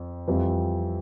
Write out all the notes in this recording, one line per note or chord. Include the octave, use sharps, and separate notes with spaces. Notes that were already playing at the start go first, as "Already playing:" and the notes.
Already playing: F2
F2 E3 G3 C4 F4